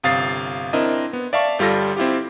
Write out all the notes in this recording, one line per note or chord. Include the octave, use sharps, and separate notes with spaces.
G1 C3 F5 D#6 A6 C7
C4 D4 E4 A#4 D#5
B3
D5 E5 F5 A5 C#6
G1 G3 F4 A4 A#6
C4 E4 F4 G4